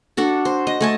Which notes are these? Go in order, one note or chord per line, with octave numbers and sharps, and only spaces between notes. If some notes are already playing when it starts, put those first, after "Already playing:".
D4 F#4 A4
C5
D#5
A3 G#5 A5